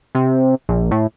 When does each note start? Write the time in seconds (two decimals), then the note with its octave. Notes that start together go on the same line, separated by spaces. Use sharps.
0.15 C3
0.69 A#1
0.91 A2